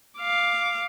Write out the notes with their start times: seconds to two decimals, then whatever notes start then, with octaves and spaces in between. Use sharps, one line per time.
0.18 F5 D6